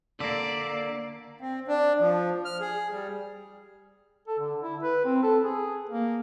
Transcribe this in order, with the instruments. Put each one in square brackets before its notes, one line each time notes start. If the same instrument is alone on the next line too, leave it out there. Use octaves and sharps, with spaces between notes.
[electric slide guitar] D3 A#3 [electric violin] D5 [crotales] D6 E6 B6
[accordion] C4
D4
F3
F6
G#4
G3
[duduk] A4
D3
E4
B4
C4
A4
G#4
A#3